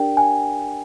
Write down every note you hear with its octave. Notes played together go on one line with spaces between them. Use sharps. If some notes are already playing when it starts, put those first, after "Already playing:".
Already playing: D4 G4 A#4 D5 G5
G#5